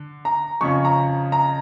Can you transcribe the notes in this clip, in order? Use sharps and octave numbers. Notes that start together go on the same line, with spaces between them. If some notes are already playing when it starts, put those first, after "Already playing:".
Already playing: D3
A#5
F2 C#3 F3 C#4 C#6
A#5
A#5